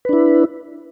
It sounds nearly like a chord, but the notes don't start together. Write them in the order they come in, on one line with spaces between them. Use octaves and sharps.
B4 D4 E4